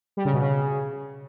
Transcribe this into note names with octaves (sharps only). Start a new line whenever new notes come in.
G3
C#3
B2
C#3